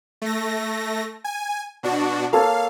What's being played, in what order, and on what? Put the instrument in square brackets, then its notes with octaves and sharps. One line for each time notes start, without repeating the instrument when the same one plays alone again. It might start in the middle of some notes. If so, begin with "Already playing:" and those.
[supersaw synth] A3 A#6
G#5
B2 D4 F#4
[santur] A#3 A4 C#5 [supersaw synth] F5